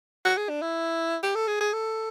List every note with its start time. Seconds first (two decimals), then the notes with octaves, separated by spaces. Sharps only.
0.25 F#4
0.37 G#4
0.49 D4
0.62 E4
1.23 G4
1.35 A4
1.48 G#4
1.60 G#4
1.73 A4